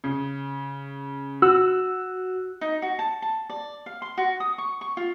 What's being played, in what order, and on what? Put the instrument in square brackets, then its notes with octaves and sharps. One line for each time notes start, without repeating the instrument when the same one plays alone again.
[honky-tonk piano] C#3
[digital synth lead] F#4 [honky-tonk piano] E6
[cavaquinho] D#4
F#4
A5
A5
D5
F5
C6
F#4
D#6
C#6
C#6
F4